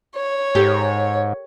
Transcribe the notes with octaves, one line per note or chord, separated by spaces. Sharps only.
C#5
G#2 G4 A4 A#4